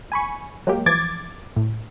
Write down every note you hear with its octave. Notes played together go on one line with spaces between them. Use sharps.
G#5 B5 C#6
F#3 G#3 A#3 G4
E3 F3 D6 G#6 A6
A2